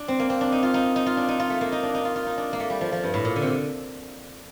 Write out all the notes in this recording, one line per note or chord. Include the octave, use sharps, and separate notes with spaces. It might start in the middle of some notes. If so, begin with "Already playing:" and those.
Already playing: D4
C4
A#3
C4
D4
D#4
F4
D#4
D#4
F4
D4
D#4
F4
A3
A#3
D#4
D4
D#4
F4
F4
D#4
D4
A#3
A3
G3
F3
F3
G2
A2
A#2
D3
C3
D3